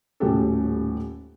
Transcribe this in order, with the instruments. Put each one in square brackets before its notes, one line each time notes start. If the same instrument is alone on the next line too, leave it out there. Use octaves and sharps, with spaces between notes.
[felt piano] D#1 A2 C#4 F#4 G4 A4